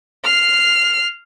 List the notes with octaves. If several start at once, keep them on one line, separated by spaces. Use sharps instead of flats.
F6 C7